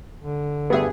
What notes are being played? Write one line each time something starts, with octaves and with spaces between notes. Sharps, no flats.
D3
G2 B3 G4 G#4 E5